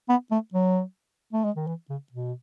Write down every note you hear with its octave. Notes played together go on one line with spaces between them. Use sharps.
B3
A3
F#3
A3
G#3
D#3
E3
C#3
B2